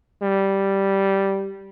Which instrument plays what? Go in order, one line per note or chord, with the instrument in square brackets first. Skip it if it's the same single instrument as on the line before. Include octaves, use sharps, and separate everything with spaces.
[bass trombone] G3